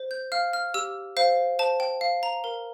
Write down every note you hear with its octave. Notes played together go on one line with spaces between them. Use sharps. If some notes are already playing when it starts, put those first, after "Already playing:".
Already playing: C5
G6
F5 F6
F6
G4 E6
C5 F5
C5 A5
G5
F5
A#5
A#4